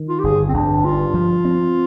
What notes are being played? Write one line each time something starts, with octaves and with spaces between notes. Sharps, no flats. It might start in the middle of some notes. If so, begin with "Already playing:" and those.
Already playing: D#3
F4
G4
G1 G#4
C4
G1 D4
G2 F4
F3
C4